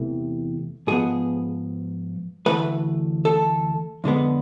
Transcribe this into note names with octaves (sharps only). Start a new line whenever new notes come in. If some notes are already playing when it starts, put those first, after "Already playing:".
Already playing: E2 C3 E3 A3
G#2 F3 B3 G#4
D2 C3 E3 A3 B4
A4
F2 D3 G#3 B3